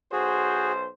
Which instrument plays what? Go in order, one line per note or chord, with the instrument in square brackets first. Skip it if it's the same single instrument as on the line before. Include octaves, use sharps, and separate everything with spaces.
[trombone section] B1 C5 [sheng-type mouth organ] F#4 G#4